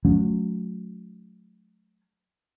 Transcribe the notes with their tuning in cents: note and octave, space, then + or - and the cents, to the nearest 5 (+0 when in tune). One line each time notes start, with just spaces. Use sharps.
F#3 -25 A3 -25 C#4 +20